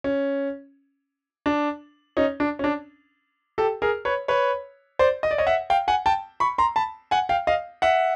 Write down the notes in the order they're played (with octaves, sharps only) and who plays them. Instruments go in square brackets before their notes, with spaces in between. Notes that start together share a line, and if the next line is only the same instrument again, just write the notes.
[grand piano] C#4
D4
C#4 D#4
D4
C#4
D4
G4 A4
G#4 A#4
B4 C#5
B4 C#5
C5 D5
D#5
D5
C#5 D#5
E5 F#5
F5 G5
F#5 G#5
G5 A5
B5 C#6
A#5 C6
A5 B5
F#5 G#5
F5 G5
D#5 F5
E5 F#5